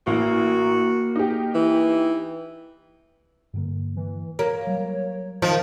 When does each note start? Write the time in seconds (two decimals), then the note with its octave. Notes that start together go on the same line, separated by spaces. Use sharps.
0.07 A1 A#3 F#4
1.16 D#4 G4
1.55 E3
3.54 G2 D3 A#3
3.96 E3
4.39 A#3 C#5
4.67 F#3 G3
5.42 D#3 F3